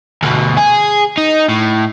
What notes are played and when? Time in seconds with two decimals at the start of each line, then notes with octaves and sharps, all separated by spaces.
0.23 D2 B2
0.57 G#4
1.17 D#4
1.48 A2